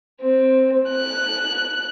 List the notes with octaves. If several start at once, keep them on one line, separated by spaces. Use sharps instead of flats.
C4
F#6